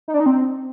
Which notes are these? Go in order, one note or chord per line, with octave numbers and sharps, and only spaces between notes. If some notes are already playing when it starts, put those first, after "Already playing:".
D#4
D4
D#4
C4